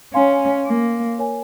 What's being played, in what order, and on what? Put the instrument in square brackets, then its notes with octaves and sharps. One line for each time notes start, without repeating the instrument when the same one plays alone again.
[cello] C#4 [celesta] C#5 F5 G#5 C6
[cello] A#3
[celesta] A#4 C#5 G#5